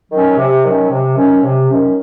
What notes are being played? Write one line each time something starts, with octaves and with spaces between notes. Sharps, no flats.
D#3 F#3 C#4
C3
D#3 F#3 C#4
C3
D#3 F#3 C#4
C3
D#3 F#3 C#4